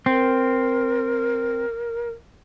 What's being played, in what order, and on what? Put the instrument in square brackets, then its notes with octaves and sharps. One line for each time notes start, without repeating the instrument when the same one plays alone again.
[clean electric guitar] C4 [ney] A#4